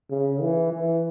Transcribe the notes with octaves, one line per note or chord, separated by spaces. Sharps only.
C#3
E3
E3